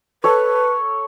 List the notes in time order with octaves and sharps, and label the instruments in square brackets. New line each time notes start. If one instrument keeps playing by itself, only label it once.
[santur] A4 C#5 [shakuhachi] B4